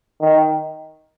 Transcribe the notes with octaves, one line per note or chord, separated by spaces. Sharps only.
D#3